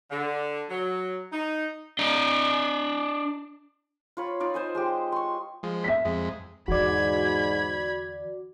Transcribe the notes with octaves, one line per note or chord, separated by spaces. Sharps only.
D3
F#3
D#4
D4 D#5
F4 C#5 B5
D#4 F4 D5
C5 D#5 G#5
G#3 F4 G4
C6 C#6
F3 G#3
E5 B6
F2 G#3
E2 G#2 D3 F#4 D5 B5 G#6